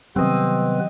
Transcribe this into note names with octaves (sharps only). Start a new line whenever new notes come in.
C3 D#3 F#3 G3 B3 C4 B4 D#5